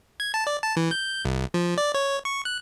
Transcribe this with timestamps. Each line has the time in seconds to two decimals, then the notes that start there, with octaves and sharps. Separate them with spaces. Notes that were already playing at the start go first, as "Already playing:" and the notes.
0.20 G#6
0.34 A5
0.47 D5
0.63 A5
0.77 E3
0.91 G6
1.25 C2
1.54 F3
1.78 D5
1.94 C#5
2.25 C#6
2.45 F#6